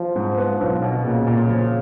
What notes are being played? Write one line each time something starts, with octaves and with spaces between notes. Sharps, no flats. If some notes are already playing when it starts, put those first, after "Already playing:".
Already playing: F3
G#2
B3
B1
B2
A#2 C#3
A#2
F3